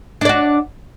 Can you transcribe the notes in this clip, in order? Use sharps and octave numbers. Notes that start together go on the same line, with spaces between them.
D4 F#4 D5